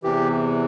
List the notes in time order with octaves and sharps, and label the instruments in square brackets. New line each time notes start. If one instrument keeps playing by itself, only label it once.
[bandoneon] E2 C3 E3 G4